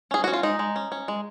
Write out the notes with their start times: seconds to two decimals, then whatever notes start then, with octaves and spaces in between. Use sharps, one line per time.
0.11 C#4 G#4
0.24 C#4 F#4
0.33 F4
0.43 G#3 D#4
0.59 G#3
0.76 C#4
0.92 C#4
1.08 G#3